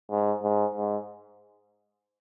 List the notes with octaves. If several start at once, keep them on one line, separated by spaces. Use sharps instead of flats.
G#2
G#2
G#2